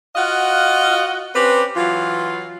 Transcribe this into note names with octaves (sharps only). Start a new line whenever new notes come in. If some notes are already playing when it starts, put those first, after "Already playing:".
F4 F#4 D#5 F5 F#5
C4 C#4 G4 B4
E3 F#3 F4